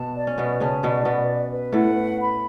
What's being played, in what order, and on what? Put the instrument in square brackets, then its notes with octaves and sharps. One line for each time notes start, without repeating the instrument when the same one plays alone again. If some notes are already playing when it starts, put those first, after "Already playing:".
Already playing: [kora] B2 B3 [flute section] A5
[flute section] D5
[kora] C#4
[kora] B2 B3 [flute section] B4
[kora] C#3 C#4 [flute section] A5
[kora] B2 B3 [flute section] D5
[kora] B2 B3 [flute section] B4
[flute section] B4
B4
[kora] A2 A3 [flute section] F#5
[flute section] B4
B5